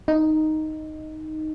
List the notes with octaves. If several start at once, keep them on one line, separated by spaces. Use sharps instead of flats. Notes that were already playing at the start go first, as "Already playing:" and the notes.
D#4